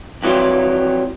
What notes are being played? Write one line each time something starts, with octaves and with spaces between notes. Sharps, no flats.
F2 E3 F#3 G3 F4